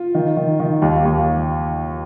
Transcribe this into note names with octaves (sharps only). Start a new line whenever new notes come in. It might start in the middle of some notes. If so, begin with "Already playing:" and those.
Already playing: F4
D#3
D#3
D#3
D#2
D#2